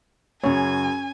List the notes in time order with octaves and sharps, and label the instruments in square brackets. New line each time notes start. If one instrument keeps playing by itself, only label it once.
[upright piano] F#2 C#3 [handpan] C#4 C#5 [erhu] G#5